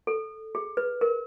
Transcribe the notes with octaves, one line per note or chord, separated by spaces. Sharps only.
A4
G#4
B4
A#4